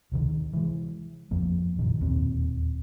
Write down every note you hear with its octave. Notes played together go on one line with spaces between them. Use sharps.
D1 C3 D#3
E3 G#3
F2 F3 A#3
F#2 A#2 D#3
E1 D#2 A#2 C4